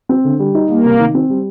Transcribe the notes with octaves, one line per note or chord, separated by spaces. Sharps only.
C4
D3
G3
D#4
G3 A#3
C3
D#3
C4
G3